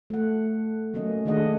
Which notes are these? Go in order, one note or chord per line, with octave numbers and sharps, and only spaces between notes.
A3 F#5
F#3 A3 A#3 C#4 D#5
D#3 A3 D4 G#4 D#5 F#5